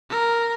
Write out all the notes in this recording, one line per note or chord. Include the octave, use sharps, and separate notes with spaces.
A#4